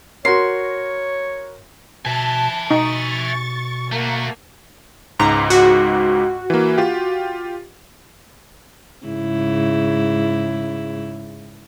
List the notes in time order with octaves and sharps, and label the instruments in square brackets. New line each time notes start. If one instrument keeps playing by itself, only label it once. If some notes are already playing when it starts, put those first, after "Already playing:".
[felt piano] F#4 A#4 [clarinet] C#5 [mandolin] C6
[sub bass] B2 [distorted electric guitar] E5 G#5 [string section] A5
[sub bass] B2 [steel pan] D#4 [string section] C#6 A6
[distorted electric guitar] A3 F#4 [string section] A#3
[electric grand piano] C#2 G#2 [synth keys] A#5
[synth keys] F#4
[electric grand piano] E3 A#3
F4 G4
[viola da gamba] G#2 C#3 E4